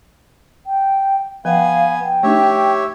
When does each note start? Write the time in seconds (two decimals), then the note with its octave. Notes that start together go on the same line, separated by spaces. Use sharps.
0.67 G5
1.45 F3 B3 F5 G5 G#5
2.03 G5
2.23 A3 D4 D#4 G4 C#5 E5